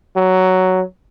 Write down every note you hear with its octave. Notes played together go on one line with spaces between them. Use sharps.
F#3